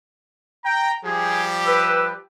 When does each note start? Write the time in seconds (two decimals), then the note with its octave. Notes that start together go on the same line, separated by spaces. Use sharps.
0.65 G5 A#5
1.05 F3 G3 G4 G#4
1.67 B4 E6